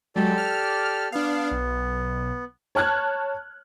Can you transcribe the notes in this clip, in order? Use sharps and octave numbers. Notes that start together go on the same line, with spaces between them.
F#3 G#3 G4 A4 D5
F6
B3 D4 F5
B1
C#5 A5 F6 F#6 G#6